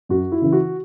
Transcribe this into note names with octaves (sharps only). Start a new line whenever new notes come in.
F#2 F#4
E4
C#3 E3
F#4